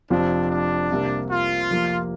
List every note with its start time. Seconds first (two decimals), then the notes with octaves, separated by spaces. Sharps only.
0.10 F1 F2 F3 C4 D4 F4
0.50 D4
0.90 C2 C3 A#3
1.30 F4
1.71 F1 F2 F3 A#3